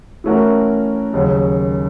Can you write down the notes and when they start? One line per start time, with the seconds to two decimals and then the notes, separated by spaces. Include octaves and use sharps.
0.24 E3 A3 C#4 F#4 A#4
1.13 D#2 C#3 F#3